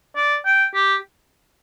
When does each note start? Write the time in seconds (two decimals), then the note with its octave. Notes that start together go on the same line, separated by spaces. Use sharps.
0.16 D5
0.46 G5
0.75 G4